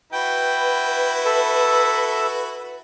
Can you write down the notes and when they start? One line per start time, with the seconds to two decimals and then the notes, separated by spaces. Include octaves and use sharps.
0.12 E4 F#4 B4 G5
1.25 A4 E5